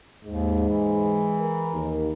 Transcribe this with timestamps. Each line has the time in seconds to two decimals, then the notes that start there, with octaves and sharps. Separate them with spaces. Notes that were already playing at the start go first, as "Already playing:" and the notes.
0.25 D#2 G#2 G#3
0.68 E3
1.40 A#4
1.73 D#2